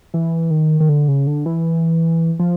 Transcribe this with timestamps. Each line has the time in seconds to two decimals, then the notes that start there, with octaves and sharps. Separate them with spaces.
0.14 E3
0.51 D#3
0.80 D#3
0.89 D3
1.08 C#3
1.27 D3
1.46 E3
2.39 F3